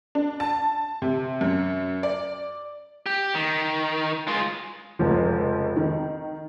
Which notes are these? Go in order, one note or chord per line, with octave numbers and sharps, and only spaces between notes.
D4
A5
C3
F#2
D5
G4
D#3
G#3 F4
F1 C#2 F3
D#3